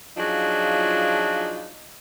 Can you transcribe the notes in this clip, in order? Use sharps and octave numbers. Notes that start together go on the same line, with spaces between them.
F3 F#3 D4 D#4 F4 G#4